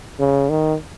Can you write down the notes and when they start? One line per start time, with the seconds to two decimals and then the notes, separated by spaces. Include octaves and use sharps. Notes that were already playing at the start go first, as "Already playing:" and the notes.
0.19 C#3
0.50 D#3